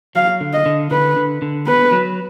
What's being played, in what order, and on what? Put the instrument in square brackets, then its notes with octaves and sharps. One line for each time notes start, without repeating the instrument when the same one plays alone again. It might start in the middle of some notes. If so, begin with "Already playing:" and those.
[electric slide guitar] F#3 [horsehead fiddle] F5
[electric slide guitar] D3
[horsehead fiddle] D#5
[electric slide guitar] D3
[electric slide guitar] D3 [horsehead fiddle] B4
[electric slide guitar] D3
D3
[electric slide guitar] B3 [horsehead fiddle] B4
[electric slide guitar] F#3